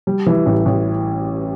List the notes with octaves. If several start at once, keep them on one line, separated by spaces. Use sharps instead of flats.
G3
E3
A1
A1